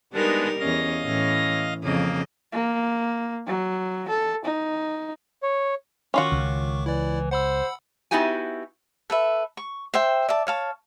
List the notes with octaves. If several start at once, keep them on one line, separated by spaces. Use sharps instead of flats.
G3 G#3 B3 D4 D#4 A#4
E2 C#4 D#5 F5 A#6
A2 E3 C#4
F2 C#3 A#3 D#5
A#3
F#3
A4
D#4
C#5
D#3 C#4 F4 F#4 C#6 D6
C#2
E3 E4 D5
C5 F#5 B5 E6
B3 D#4 E4 F#4 G4 G#5
A4 B4 E5
C#6
C5 E5 G5
D5 E5 A5
C#5 F5 A5